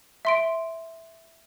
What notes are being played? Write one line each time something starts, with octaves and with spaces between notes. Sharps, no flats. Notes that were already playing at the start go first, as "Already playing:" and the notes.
E5 C6 D7